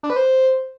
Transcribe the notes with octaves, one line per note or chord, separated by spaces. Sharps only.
D4
B4
C5